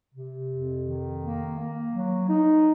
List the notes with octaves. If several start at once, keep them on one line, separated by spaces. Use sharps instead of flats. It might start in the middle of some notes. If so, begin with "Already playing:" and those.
C3
F2
D#3
A#3
A#3
F#3
D#4